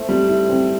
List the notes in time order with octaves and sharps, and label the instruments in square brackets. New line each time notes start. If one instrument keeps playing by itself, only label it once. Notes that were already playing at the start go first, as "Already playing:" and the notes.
Already playing: [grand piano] A3 [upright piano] E4 C5
[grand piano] G3 [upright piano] C4
[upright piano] E4
C4